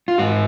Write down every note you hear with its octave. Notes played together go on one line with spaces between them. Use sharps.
F4
G#2 F#4